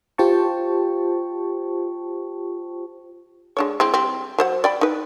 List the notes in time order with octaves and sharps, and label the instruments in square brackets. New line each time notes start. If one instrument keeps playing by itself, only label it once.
[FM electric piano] F4 G4 C5 G5 A5 C#6
[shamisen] G#3 D4 C#5
G#3 C4 E4
G3 C4
F#3 C5 F#5
D5 G5 B5
D#4 B4